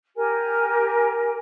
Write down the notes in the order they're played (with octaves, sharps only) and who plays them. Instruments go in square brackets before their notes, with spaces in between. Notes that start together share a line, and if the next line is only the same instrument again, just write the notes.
[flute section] G4 A#4 G#5